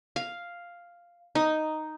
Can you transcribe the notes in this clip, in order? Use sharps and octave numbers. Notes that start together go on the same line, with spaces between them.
F5
D#4